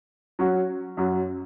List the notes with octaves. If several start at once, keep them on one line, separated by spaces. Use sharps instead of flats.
F#3 C#4 F#4
F#2 F#3 C#4 F#4